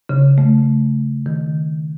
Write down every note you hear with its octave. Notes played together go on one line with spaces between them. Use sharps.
C#3
A3
D#3